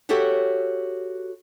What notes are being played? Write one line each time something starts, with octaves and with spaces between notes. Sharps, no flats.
F#4 G4 A4 C#5 E5 F#5